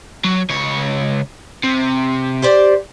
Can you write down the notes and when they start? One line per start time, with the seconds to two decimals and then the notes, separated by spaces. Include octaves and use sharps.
0.25 F#3
0.50 C#2 C#5
1.64 C3
2.42 G4 C5 D5